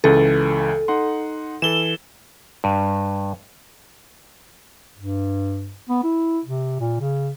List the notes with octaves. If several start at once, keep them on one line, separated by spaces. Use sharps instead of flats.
C#2 C#3 E3 A4
D#4 F#5 C6
E3 A4 E7 G7
G2
G2
B3
E4
C3
A#2
C#3